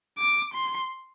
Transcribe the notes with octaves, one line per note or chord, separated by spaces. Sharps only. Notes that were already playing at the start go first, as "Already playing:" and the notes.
D6
C6